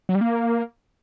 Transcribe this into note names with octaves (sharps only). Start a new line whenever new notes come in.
F#3
G3
A#3